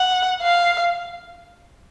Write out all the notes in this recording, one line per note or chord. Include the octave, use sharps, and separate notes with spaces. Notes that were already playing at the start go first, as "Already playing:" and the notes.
Already playing: F#5
F5